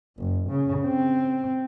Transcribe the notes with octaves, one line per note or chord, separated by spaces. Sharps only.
F#1
C#3
C4